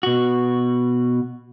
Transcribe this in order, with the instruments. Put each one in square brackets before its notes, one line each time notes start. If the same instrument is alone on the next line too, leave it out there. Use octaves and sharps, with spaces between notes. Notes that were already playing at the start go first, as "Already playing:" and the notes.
[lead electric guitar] B2 F#4